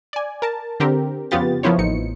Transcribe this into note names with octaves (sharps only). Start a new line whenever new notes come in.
D5 G#5
A#4 A5
D3 C4 G4 A#4
F2 C#3 B3 F4 G4 A6
F3 A#3 B3 E4 C5 C#5
A1 D#4 C#7